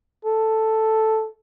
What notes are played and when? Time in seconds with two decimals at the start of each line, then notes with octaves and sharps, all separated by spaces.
0.25 A4